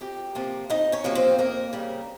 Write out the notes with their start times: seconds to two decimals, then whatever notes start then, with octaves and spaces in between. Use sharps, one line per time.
0.01 F2 G4 G5
0.35 C3 F3 A#3
0.70 F2 D#4 D#5
0.92 C#4 C#5
1.04 C3 F3 A#3
1.15 C4 C5
1.39 F2 A#3 A#4
1.73 C#3 G3